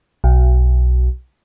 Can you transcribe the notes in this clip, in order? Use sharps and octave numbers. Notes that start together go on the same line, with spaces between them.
B1